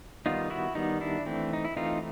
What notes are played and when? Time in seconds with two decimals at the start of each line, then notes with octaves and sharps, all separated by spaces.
0.26 D#3 G3 B3 D#4 F4
0.50 E4 F#4
0.75 D#3 G3 B3 D#4
1.01 D4 E4
1.26 E3 A3 C4
1.53 D#4
1.65 E4
1.77 E3 A3 C4 D#4 F4